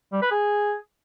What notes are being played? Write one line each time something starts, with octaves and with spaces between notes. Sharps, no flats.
G3
B4
G#4